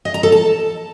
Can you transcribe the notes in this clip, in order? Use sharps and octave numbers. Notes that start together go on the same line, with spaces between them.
D#5
A#5
A4
A5